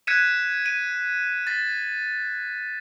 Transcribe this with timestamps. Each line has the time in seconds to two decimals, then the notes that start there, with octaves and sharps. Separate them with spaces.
0.07 F#6 G#6 B6 C#7 D#7 E7
0.66 D#7
1.47 A6 B6